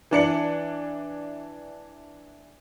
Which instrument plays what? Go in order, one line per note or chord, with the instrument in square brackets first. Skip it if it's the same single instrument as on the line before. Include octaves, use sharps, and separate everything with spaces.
[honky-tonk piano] E3 D4 C#7 F#7